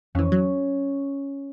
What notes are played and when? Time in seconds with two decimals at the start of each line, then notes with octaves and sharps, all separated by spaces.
0.15 F2 E3 C#4
0.32 F#3